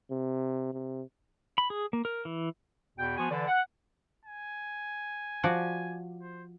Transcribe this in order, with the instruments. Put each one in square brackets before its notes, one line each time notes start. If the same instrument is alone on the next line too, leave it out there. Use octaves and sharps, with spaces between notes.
[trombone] C3
C3
[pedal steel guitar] B5
G#4
A#3
A#4
E3
[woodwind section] E2 B2 G5
F3 B3 F#4 G#5
D3 E3 D5
F#5
[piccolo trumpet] G#5
[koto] F3 F#4 D5
[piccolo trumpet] C5